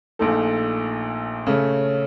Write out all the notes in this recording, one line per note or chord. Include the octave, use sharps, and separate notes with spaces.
A#1 A#2 A3 D#4 A4
C#3 A3 C#4